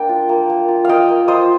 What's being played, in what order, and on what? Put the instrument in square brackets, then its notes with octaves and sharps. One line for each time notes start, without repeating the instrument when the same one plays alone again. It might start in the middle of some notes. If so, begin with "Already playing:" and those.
Already playing: [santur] A#3 D4 G5
F4
A#3
A#3
F4
A#3 D#5 F5 G5
A#3
F4 C5 D#5